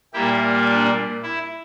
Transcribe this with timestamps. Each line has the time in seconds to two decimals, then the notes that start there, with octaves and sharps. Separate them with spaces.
0.13 A#2 G3 A#3 E4 G4
0.68 D4
1.22 E4